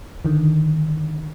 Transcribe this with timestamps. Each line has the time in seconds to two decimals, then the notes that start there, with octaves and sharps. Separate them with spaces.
0.25 D3 D#3